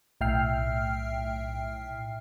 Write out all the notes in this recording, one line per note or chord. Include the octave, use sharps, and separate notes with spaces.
B1 A2 E5 G5 F6 C7